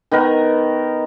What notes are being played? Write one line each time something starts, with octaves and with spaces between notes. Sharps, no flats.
D#3 B3 A#4